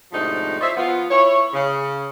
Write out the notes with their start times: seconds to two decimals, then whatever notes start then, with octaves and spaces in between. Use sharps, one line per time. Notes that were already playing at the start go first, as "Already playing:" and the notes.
0.12 A2 C3 F3 G#3 D4 D#4
0.61 F4 C5 C#5 D#5 E5
0.77 F3 B3 F4
1.11 E4 C#5
1.53 C#3